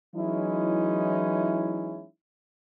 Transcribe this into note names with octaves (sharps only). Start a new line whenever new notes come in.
E3 F#3 G#3 C#4 D#4 E4